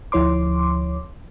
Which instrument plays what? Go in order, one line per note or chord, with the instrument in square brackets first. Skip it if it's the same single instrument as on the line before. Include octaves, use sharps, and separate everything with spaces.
[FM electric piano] D2 F3 E4 C#5 C6 D6